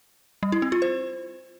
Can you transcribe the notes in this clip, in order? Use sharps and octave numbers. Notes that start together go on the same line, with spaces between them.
G3
E4
C4
F4
C5